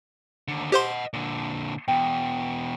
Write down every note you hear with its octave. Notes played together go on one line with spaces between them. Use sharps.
D#2 D3
G4 C5 D#5 F#5 C6
A#2 D3
E2 B2 G5